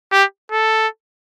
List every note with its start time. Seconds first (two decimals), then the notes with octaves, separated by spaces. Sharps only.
0.12 G4
0.52 A4